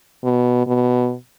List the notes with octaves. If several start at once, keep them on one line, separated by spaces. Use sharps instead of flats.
B2
B2